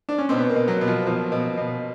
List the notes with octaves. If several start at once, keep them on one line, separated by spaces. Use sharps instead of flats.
D4
C#4
B2 C4
B3
A#3
B2
F#3
B2
F3
B2 F3
B2
B2